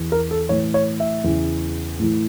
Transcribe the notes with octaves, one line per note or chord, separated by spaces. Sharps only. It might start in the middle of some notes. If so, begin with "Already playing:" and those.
Already playing: E2 E3
A#4
A4
A2 E3 C#5
C#5
E5
E2 C#3 E3
A2 E3